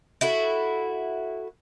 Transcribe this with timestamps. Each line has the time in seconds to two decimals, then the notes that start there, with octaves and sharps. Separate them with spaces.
0.21 E4 F#4 A4